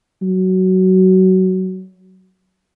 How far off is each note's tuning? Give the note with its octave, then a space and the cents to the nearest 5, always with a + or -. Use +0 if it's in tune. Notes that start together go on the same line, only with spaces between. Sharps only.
F#3 +15